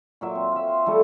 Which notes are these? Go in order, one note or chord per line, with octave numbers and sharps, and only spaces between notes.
A#2 F#3 E5
C4
F4 E5
C6
F3 G3 A3 A4